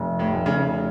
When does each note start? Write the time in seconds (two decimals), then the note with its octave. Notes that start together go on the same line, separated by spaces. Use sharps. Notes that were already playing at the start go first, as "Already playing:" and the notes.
Already playing: F1
0.19 A2
0.33 F1
0.46 C#3